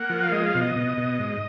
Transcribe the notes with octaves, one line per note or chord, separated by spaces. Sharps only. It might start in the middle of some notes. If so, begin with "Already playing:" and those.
Already playing: A#3 F#5
F3
F5
G#3 D#5
F5
B2
D#5
B2
B2
G#2